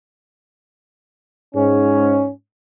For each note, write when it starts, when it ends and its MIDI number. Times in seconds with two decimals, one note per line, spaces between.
1.55 2.29 44
1.55 2.29 61